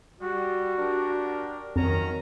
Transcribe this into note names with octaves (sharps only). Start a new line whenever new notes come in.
G3 F#4
D4 G4 A#4
F2 D#3 F#3 C#4 A#5